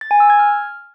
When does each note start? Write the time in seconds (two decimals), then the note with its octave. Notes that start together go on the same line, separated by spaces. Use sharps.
0.01 A6
0.11 G#5
0.20 E6
0.30 G#6
0.39 F6